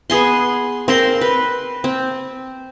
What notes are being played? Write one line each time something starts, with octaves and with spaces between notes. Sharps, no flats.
B3 G#4 G#5 C6
C4 A#4 C6
B4
C4